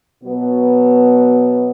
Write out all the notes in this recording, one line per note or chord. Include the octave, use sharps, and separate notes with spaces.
B2 F#3 B3